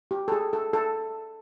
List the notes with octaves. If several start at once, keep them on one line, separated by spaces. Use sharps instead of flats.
G4
A4
G#4
A4
A4